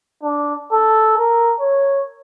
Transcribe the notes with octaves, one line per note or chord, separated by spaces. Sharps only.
D4
A4
A#4
C#5